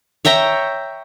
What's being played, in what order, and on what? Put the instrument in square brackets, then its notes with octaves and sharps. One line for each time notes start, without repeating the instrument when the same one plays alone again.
[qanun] C#5 E5 G5 A#5